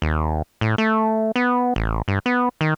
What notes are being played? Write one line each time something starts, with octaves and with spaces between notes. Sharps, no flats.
D#2
A2
A3
B3
A1
G2
B3
D#3